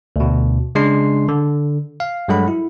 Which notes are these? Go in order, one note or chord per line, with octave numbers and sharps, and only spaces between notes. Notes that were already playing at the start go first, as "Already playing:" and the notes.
D2 B2
C#3 G#3 D4 C6 C7
D3
F5
G2 F#3 G#3 A4 F#5 B5
E4